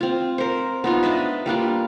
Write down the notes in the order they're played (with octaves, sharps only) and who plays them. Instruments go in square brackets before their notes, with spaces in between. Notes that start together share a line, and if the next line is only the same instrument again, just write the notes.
[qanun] C4 F4
A#4 C5
B3 D#4 F4
D4 B4 D#5 E5
G3 A#3 D4 F4